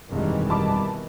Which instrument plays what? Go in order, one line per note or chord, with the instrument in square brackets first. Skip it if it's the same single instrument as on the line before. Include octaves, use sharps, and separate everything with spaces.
[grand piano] F1 G2 G#3 [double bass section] B2 D#3 E3 [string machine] G3
[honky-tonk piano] A5 B5 D6